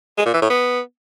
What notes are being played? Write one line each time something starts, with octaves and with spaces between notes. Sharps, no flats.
G#3
A#2
E3
A2
B3